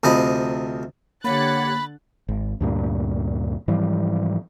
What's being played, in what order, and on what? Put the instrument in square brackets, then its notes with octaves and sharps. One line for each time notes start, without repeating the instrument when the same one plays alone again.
[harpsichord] D2 C3 F3 D#5 B5
[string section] D3 F#6 A6 [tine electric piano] A#3 [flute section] G4 C#5 F#5 [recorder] B5
[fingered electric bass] G#1
D2 G2 A#2
G#2 E3 F3 G3